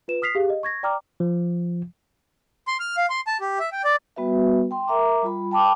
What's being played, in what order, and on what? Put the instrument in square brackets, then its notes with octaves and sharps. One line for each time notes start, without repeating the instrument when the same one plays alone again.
[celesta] F4 B4 E7
D#6 F6 B6 C7 F7
G4 G#4 F5
D#5
C#6 G#6 A#6
D5 G5 A#5 D6 F6
[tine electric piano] F3
[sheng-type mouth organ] C6
F6
F5
C6
A5
G4
E5
G5
D5
[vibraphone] G3 B3 F#4 B4 E5
G5 C6
A#4 E5 A#5 D6
G3 F4 B5
G5 A5 B5 D6